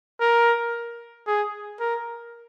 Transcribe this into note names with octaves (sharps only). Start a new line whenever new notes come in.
A#4
G#4
A#4